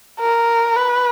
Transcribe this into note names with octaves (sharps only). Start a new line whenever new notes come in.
A#4
B4